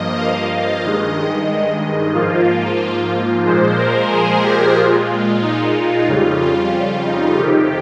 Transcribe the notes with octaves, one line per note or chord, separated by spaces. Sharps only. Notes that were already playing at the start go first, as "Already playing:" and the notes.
Already playing: G2 F3 A#3 D#5
F5
D#5
G2 D#3 G#3
G#2 F3 A#3 F4
A#2 F3 G#3 C5
A#4
G#4
G4
A#2 G#3 F4
D#4
F2 C#3 G3 F4
F4
F4
D#4
F2 C3 D#3 G4